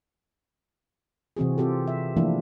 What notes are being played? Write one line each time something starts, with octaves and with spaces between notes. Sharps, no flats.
C3 E3 C4 F#4 G#4
C4 F4 G4 A4
E5
E3 F3 A3 A#3 D4 E4